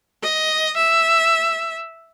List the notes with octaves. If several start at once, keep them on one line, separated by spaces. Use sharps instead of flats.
D#5
E5